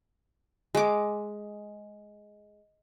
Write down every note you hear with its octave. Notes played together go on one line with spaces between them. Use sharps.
G#3 D6